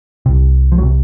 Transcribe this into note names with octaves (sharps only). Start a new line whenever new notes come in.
C2 C3
F3
C2 C3 F#3